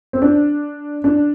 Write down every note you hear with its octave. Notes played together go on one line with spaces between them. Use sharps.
C4
D4
D4